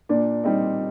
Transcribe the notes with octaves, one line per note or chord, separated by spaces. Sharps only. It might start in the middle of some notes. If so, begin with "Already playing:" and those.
A#2 D4 D5
G3 C4 D#4